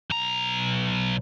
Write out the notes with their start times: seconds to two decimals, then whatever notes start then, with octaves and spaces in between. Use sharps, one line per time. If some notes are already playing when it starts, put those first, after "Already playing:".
0.10 B1 A#5